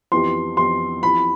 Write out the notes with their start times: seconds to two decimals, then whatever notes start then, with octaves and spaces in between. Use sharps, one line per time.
0.12 F2 E3 B3 E4 G4 C6
0.57 F2 E3 B3 E4 G4 C6
1.03 F2 E3 B3 E4 G4 B5